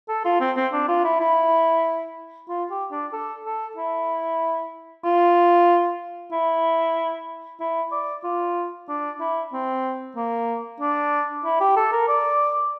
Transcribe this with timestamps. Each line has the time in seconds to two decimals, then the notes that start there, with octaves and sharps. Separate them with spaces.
0.09 A4
0.25 F4
0.40 C4
0.56 C4
0.73 D4
0.89 F4
1.05 E4
1.20 E4
2.49 F4
2.70 G4
2.91 D4
3.13 A4
3.45 A4
3.77 E4
5.04 F4
6.32 E4
7.60 E4
7.92 D5
8.24 F4
8.88 D4
9.20 E4
9.53 C4
10.16 A#3
10.80 D4
11.45 E4
11.60 G4
11.76 A4
11.92 A#4
12.08 D5